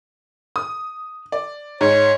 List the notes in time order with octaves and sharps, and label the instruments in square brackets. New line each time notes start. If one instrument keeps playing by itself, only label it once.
[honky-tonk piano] D#6
D5
[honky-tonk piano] G#2 [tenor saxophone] C#5